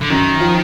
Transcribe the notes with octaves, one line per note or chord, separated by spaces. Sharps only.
D3
F#2 D#3
F3